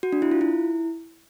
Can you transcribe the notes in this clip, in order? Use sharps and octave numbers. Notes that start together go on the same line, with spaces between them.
F#4
D4
E4
F4
E4